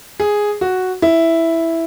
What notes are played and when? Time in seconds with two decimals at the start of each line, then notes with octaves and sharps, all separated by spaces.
0.20 G#4
0.61 F#4
1.02 E4